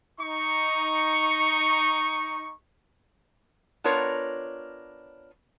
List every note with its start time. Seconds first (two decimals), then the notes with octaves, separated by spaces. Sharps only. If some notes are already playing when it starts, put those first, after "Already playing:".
0.20 D#4 C#6
3.84 B3 D4 F4 A#4 C#5